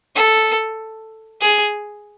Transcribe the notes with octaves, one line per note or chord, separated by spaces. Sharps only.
A4
G#4